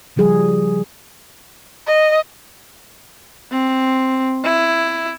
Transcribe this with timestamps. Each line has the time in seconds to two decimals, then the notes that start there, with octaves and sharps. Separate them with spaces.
0.16 C#3 F3 G3 G#4
1.87 D#5
3.51 C4
4.44 E4